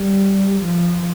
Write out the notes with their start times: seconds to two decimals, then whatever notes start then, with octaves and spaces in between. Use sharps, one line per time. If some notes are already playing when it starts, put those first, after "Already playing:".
Already playing: G3
0.63 F3